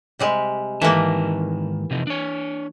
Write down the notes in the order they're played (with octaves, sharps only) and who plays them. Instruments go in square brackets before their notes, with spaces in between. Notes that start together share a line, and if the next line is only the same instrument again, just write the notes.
[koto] C3 G3 G#3
[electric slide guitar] G#2 D#3 A5 [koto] E3 A#3
[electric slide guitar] C3 F3 D#4
D4 C#5